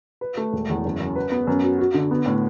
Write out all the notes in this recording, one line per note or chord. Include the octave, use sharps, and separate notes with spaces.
B4
A3
E1
E2
F#1
F#2
B4
B3
F#2
F#3
F#4
D3
B3
A2